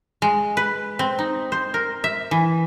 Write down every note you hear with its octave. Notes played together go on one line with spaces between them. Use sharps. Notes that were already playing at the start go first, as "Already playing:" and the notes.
G#3
B4
C4
D#4
C5
A#4
E5
E3